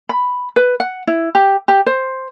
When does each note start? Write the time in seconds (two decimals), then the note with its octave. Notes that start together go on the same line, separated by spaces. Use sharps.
0.09 B5
0.56 B4
0.80 F#5
1.07 E4
1.35 G4
1.68 G4
1.86 C5